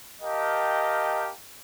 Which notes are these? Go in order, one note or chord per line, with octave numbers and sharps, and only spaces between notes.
G4 A#4 D#5 F5 G5 A5